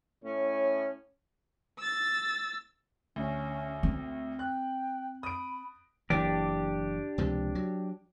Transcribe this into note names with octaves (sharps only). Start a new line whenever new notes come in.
A2 C#4
E6 A6
D2 C#4
C4
G5 F#6
B5 D#6 D7
F#1 E3 D4 G4
C#2 C3 F3
F#3